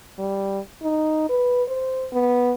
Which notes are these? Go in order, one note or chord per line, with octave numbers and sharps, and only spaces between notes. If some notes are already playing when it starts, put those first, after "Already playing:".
G3
D#4
B4
C5
B3